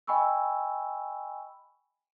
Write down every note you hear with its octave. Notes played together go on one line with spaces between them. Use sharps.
D#5 G5 G#5 B5 C#6 E6